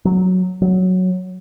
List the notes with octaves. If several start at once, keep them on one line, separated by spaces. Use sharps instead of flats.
F#3
F#3